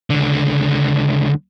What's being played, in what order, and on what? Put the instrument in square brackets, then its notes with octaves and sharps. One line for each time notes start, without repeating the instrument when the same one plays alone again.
[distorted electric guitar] C#2 D3